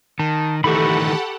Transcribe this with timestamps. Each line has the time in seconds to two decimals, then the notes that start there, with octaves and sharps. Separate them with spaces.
0.19 D#3 A5
0.64 D#3 E3 A3 G4 A4 F#5 B5 C#6